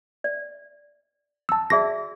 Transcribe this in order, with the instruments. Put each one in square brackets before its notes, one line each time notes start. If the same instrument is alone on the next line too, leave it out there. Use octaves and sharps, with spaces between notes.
[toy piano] D5
[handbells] A5 E6
[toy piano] F#4 G#4 D5 [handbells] E5 A#6